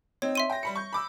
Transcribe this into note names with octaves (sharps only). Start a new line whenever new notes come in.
C4 D#4 C#5
E5 C6 D#7
G5 A#6
G3 B5 C#7
C#6 G6
B5 D6 E6